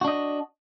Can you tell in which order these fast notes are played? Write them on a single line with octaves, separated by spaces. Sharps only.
F#4 D4 D#5